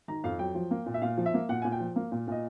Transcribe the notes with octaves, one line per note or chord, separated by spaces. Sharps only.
D#3 A#5
F2 F5
F#3 G5
F3
A#3
A#2
E5
A#2 F5
F3
E5
A#3
A#2 F#5
A#2 G#5
G5
F3
A#3
A#2
A#2 D#5